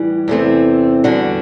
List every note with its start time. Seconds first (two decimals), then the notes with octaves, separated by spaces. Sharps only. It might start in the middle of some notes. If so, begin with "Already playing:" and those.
Already playing: A2 E3 G3
0.28 E2 C3 E3 A3 C4
1.04 E2 D3 G3 D4 F#4